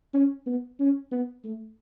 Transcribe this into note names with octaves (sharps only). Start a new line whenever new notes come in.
C#4
B3
C#4
B3
A3